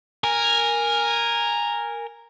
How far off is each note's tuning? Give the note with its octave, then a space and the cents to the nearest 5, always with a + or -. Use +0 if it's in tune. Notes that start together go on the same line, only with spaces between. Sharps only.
A#4 +0 G#5 -10